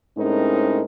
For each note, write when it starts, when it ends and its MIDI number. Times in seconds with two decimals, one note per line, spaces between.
0.18 0.83 45
0.18 0.83 56
0.18 0.83 60
0.18 0.83 61
0.18 0.83 63
0.18 0.83 70